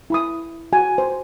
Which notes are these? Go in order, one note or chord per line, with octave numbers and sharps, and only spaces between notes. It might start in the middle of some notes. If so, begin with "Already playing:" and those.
E4 B5 D#6
F#4 G#5
C5